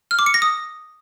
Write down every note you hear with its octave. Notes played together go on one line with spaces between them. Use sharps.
F6
D6
C#7
A#6
D#6